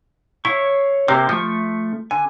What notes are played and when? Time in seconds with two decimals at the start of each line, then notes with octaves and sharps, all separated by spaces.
0.45 E4 C#5 F5 C#6
1.08 C3 A#3 G4 C5 D6
1.29 F3 A3 C#6
2.11 D3 G#5